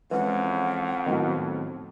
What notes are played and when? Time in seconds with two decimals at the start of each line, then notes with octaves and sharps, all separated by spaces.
0.11 F2 E3 G#3 C#4 F#5
1.06 A2 D#3 F#3 B3